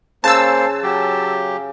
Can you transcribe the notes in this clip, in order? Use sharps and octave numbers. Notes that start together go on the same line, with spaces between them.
C#3 A#3 C5 A5 E6
F#3 G4